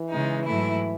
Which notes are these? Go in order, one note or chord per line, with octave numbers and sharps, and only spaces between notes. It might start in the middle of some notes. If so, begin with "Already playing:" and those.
Already playing: E3
C#3 G#3 D#4
G#2 F#3 A3 E4